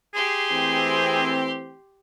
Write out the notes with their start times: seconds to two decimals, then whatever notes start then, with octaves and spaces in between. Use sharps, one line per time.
0.14 G4 G#4 C6
0.52 E3 A3 C4